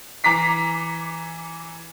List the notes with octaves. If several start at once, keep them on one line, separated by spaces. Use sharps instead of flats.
E3 A#5 D6 B6 C7